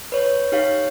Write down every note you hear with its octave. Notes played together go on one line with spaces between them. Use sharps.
B4 C#5
D#4 G4 C#5 F5